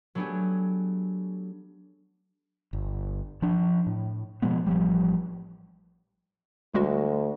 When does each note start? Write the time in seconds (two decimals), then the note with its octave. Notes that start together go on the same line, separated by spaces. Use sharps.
0.15 F#3 A3 B3 D4 G4 G#4
2.73 G1
3.42 F3 D4
3.86 A2
4.42 B2 F3 G#3 B3
4.66 A1 F3 G3
6.74 D2 G3 G#3 F#4